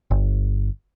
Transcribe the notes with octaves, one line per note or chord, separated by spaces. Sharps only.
G1